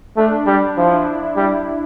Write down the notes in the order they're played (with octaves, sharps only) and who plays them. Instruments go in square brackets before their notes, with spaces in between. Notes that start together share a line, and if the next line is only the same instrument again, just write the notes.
[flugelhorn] A3 [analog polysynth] D4
[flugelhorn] G3
[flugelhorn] F3 [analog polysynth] E4
[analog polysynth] D4
D4
D4
[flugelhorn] G3